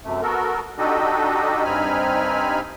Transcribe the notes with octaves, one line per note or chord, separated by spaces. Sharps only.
F#2 C3 A3
B3 F#4 A4 A#4
D4 D#4 F#4 G4 A4 D#5
G2 C4 D#4 G#5 B5 F6